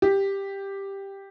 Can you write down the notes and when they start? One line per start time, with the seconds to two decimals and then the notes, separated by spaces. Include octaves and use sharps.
0.02 G4